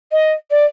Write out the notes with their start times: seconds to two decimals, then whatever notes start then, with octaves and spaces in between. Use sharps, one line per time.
0.11 D#5
0.50 D5